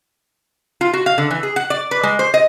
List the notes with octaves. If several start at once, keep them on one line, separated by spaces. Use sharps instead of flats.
F4
F#4
F5
D3
E3
G#4
F#5
D5
B4
G#3
C5
D#5